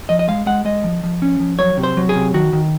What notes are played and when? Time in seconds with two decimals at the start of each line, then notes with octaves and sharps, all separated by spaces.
0.09 F3 D#5
0.19 D#5
0.28 G#3 F5
0.46 G#3 F#5
0.65 G#3 D#5
0.84 F3
1.03 F3
1.22 C#4
1.40 F3
1.59 F#3 C#5
1.77 C3
1.83 C5
1.97 F#3
2.09 G#4
2.16 C3
2.34 D#3 F#4
2.53 D#3